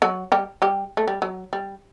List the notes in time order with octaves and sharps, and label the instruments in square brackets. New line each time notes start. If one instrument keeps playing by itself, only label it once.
[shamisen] F#3 F#4
G3 G4
G3 G4
A3
G3
F#3
G3